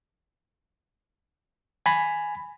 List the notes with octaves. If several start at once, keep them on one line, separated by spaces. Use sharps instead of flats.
G#5 B5